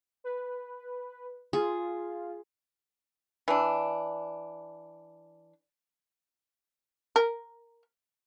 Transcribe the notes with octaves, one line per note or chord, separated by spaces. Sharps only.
B4
F4 G#4
E3 D4
A#4